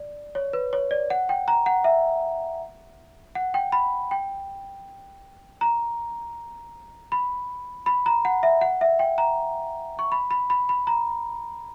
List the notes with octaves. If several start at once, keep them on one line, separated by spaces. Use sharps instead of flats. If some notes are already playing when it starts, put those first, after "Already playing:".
Already playing: D5
C#5
B4
C#5
D5
F#5
G5
A#5
F#5
E5
F#5
G5
B5
G5
A#5
B5
B5
A#5
F#5
E5
F#5
E5
G5
A#5
C#6
B5
B5
B5
B5
A#5